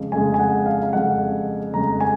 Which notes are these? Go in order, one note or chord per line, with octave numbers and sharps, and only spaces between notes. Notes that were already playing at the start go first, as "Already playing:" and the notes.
Already playing: F2 C#3 G#3
F2 C#3 G#3 G#5
G#5
F#5
F5
F5
F2 C#3 G#3 F#5
F2 C#3 G#3 A#5
G#5